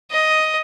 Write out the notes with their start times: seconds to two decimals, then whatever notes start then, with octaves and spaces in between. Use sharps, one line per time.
0.11 D#5